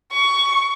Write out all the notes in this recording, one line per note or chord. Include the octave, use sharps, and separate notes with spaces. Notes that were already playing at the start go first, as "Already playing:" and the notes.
C#6